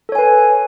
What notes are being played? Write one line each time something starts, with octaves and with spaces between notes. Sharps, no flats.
A4 B4 C#5 G#5